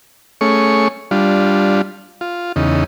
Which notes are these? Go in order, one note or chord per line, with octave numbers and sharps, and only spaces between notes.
A3 C#4 G#4 C#6
G3 D4 F4
F4
E2 C#3 D#4